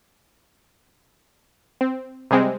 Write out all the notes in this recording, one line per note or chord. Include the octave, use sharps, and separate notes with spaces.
C4
C3 G3 G#3 C4